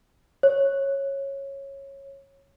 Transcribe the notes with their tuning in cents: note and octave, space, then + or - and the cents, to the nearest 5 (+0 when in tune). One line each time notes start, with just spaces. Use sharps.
C#5 -15